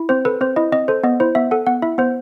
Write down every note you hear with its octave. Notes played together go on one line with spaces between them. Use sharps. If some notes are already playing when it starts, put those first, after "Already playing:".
Already playing: E4
C4 C5
A4 B4
C4 C5
E4 D#5
C4 D#5
A4 C5
B3 D#5
E4 C5
B3 E5
A4 F#5
B3 F#5
E4 E5
B3 C5